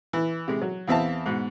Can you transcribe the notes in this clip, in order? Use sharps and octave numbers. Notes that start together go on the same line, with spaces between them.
E3
C3 G#3
F#3
E2 E3 C4 E5 F5 A5
G#2 B2